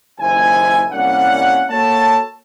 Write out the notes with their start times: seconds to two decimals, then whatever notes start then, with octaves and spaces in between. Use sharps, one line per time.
0.19 F#1 D#2 E4 C5 G#5
0.93 C2 G3 A#3 C#4 F#5
1.70 A#3 F#4 A4 C#5 A5